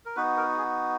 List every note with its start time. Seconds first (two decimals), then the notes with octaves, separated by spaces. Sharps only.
0.06 A#4
0.16 B3 D#4 F#4 B4
0.37 A#4
0.57 G#4